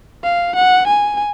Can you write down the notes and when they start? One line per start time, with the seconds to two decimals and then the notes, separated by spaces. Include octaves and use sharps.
0.24 F5
0.56 F#5
0.87 G#5